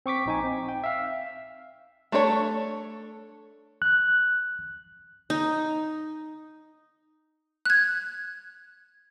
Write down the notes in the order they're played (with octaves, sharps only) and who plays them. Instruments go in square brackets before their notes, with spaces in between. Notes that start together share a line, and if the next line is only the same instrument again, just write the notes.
[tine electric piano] C4 C#6 D6 B6
A#1 D#4 G#5
C4
G5
E5 F5
[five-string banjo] A3 D4 A4 B4 C#5
[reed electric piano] F#6
[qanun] D#4
[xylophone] F#6 G#6